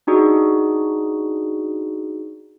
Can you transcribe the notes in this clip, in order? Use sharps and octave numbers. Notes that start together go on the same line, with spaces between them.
D4 D#4 F#4 G#4 D5